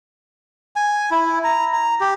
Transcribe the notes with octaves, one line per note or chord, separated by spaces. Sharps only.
G#5
E4
A#5
A#5
G4